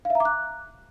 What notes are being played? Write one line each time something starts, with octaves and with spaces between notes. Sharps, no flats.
F5
E5
A#5
D6
F#6